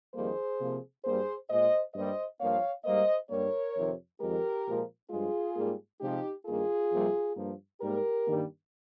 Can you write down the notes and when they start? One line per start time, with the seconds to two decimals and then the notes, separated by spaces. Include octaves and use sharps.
0.15 F2 D#3 G3 A#3 G#4 C5
0.60 C3 F3 A#3
1.05 G2 G3 A#3 G#4 C5
1.50 A#2 G#3 C5 D#5
1.95 G2 G3 A#3 C5 D#5
2.40 G2 F3 A#3 C#5 F5
2.85 G#2 G3 A#3 C5 D#5
3.30 G2 G3 A#3 A#4 C#5
3.75 F2 C3 D#3
4.20 F2 D#3 G#3 G4 A#4
4.66 A#2 F3 G#3
5.10 G2 F3 G#3 F4 G#4
5.56 G#2 G3 A#3
6.01 C3 F3 G#3 D#4 G4
6.46 G2 D#3 A#3 F4 G#4
6.90 F2 C3 G3 A#3
7.36 G2 F3 A#3
7.81 G#2 G3 A#3 G4 A#4
8.27 G2 D#3 G3 A#3